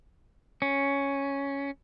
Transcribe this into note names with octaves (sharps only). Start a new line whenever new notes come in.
C#4